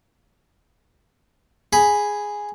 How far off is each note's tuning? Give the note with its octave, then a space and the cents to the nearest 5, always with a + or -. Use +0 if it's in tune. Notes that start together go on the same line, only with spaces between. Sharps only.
G#4 +0 B5 +0